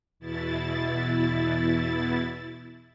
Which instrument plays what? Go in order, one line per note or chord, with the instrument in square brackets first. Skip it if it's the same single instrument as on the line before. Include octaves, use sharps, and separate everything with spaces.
[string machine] E2 B2 E4 A6